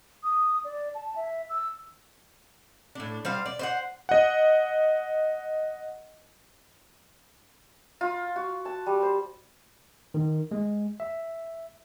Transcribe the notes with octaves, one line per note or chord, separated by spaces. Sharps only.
D#6
D5
A5
E5
E6
A2 D4
G3 C5 F5
D5
C5 D#5 F#5
D#5 F#5
F4
F#4
A5
G3
C5
D#3
G#3
E5